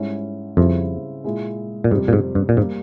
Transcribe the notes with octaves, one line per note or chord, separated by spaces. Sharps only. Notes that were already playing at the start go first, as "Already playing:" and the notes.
Already playing: G#2 G3 C#4 E4
F2 C#3 G3 C4 E4
A#2 G#3 E4
A#2
F2 G#2 C3 G3
A#2
G#2
G2
A#2
G#2 G3 A#3